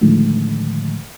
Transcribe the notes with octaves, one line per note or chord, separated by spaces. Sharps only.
A2 D3 D#3 F3 G#3 A3